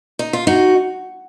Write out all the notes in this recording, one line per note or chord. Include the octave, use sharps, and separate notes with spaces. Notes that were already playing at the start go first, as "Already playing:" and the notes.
D#4
F4
D#4 F#4